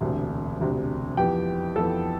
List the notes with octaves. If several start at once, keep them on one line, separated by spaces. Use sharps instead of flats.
E1 D2 C3
E1 D2 C3
F2 E3 B3 G4 G5
F2 E3 B3 A4 A5